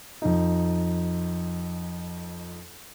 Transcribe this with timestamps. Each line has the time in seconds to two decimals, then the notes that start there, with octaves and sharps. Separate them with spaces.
0.22 F2 D#4